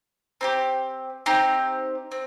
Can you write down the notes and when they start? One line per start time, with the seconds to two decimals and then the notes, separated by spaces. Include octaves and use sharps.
0.41 C4 D#4 G4
1.26 C4 D#4 G4
2.12 C4